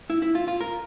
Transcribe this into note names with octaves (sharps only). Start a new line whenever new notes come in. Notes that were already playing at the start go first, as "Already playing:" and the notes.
E4
E4
F4
F4
A#4